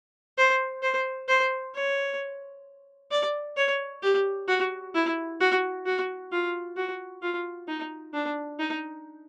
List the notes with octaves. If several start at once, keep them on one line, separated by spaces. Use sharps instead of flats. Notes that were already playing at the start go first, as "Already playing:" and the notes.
C5
C5
C5
C#5
D5
C#5
G4
F#4
E4
F#4
F#4
F4
F#4
F4
D#4
D4
D#4